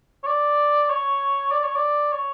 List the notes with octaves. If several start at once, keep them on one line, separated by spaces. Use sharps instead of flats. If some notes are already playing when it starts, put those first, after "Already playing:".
C#5
D5
C#5
D5
C#5
D5
C#5